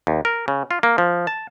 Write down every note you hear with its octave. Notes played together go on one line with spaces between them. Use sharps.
D#2
A#4
C#3
F4
A#3
F3
A5